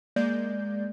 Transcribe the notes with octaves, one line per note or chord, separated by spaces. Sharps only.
G#3 A#3 D5 G6